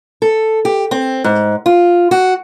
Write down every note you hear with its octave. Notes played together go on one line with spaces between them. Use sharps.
A4
G4
C4
G#2
F4
F#4